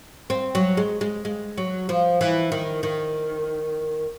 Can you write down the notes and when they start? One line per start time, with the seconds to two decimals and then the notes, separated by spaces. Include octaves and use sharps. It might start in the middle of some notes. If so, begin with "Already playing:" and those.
0.30 C4
0.55 F#3
0.77 G#3
1.01 G#3
1.25 G#3
1.58 F#3
1.89 F3
2.21 E3
2.52 D#3
2.83 D#3